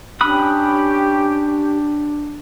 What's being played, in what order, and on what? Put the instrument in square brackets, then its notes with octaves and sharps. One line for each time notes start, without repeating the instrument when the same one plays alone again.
[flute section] C#4 G4 [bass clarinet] D4 [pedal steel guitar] B5 D#6 F#6